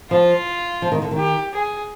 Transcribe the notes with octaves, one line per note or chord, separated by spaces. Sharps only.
F3 F4
F3
D#3
D3
D#3
G4
G#4